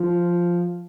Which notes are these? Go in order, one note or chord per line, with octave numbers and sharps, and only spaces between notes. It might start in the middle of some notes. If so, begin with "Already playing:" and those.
Already playing: F3